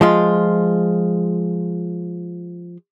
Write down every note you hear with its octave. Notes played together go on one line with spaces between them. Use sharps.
F3 G#3 F4